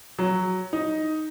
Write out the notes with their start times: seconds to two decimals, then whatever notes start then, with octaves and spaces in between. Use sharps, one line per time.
0.19 F#3
0.73 D#4